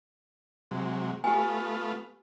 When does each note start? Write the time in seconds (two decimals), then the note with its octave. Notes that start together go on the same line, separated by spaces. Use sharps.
0.71 C3 F#3 G#3
1.24 A3 B3 F4 G4 G#5